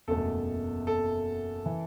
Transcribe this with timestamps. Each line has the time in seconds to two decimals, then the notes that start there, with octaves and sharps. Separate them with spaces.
0.08 F#1 E2 B2 A3 A4
0.87 A4
1.66 E3